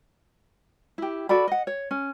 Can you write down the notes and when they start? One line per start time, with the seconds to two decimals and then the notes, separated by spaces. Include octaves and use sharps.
0.98 E4 G4
1.29 F#4 A4 D5 B5
1.48 D#5 F#5
1.67 C#5
1.91 C#4